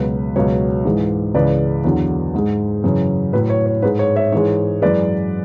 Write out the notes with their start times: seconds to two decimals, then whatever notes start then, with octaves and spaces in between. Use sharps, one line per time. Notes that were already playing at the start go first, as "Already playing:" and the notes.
Already playing: C#2 B2 F#3 B4
0.36 C#2 B2 F#3 C#5
0.85 G#2 E3 G#3
1.34 C#2 C#3 E3 G#3 B4 D5
1.84 E2 D3 F#3
2.34 G#2 G#3
2.84 F#2 C#3 E3 C#5
3.33 A2 F#3 B4
3.50 C#5
3.66 C#5
3.82 G#2 G#3 B4
3.99 C#5
4.16 C#5 E5
4.32 G#2 E3 G#3 C#5
4.82 F#2 E3 G#3 B4 D5